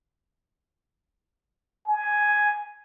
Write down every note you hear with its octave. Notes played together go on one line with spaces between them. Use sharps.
G#5